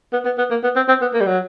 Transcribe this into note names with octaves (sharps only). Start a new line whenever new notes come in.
B3
B3
B3
A#3
B3
C4
C4
B3
A#3
G3
F#3